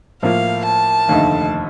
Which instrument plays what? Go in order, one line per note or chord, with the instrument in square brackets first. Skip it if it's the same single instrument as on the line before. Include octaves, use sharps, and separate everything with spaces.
[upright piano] A2 F3 A#3 [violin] F5
[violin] A5
[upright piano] F1 D#2 D3 A3 D#4